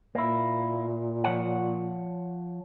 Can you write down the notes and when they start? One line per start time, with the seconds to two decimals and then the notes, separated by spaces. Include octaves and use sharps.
0.15 A#2 A#3 E4
1.24 F3 C#5 F#5